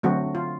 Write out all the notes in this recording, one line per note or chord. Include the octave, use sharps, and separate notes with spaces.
D3 F#3 A3 C4 F#4
F4